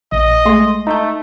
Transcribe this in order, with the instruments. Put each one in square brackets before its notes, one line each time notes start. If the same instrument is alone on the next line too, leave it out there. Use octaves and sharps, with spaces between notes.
[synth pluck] A#1 [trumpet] D#5
[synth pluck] G#3 A3 C6
[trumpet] A3 [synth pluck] D#4 G6